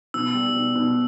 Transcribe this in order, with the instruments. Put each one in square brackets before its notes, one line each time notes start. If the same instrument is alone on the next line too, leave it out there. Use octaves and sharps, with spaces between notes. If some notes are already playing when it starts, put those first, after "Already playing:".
[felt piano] B2 [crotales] E6
[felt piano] G3
B2
B2